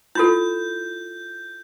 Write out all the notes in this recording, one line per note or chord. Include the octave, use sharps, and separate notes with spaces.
E4 F4 A4 G6